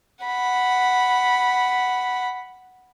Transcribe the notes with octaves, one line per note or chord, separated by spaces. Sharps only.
F#5 B5